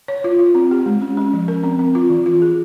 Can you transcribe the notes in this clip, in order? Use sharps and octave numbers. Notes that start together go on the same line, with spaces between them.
C#5
F4
F4
C4
G4
G#3
C#4
C#4
F3
A#4
C4
C4
F4
E3
F4
G#4